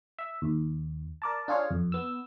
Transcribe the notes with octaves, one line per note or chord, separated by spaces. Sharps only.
E5
D#2
A#4 D5 A5
D4 F4 G#4 C#5 F5
F2
B3 E6